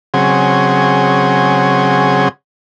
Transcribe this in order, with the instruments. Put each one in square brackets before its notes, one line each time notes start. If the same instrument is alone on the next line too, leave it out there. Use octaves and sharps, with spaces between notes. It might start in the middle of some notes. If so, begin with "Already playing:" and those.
[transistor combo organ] C#3 F#3 C4 G#4